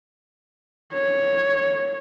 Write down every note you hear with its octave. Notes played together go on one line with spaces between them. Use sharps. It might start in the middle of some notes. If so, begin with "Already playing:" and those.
C#5